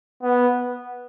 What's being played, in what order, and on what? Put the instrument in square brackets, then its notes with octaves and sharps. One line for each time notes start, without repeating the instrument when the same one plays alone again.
[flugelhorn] B3